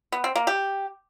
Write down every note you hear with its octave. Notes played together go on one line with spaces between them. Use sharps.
B3
C4
A#3
G4